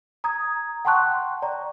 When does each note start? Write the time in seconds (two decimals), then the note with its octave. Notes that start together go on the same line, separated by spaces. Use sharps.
0.24 A#5 D#6 G#6
0.85 F#5 G5 A5 C6 C#6 F#6
1.42 D5 A#5